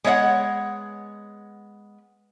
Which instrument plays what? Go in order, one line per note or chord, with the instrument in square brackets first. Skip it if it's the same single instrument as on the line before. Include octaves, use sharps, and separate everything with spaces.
[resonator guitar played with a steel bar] G#3 B3 C#5 D#5 F#5